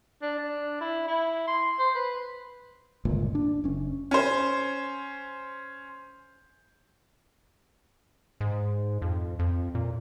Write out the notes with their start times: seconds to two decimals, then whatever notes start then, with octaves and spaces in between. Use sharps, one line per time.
0.22 D4
0.38 D4
0.81 E4
1.07 E4
1.48 C6
1.79 C5
1.95 B4
3.05 G1 C#2 A#2
3.35 D4
3.64 F#1 C#4
4.11 C#4 C5
8.41 G#2
9.02 F2
9.39 F2
9.75 A#2